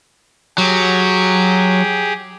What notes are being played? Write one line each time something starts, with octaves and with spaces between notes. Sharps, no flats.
F#3 G4 G#4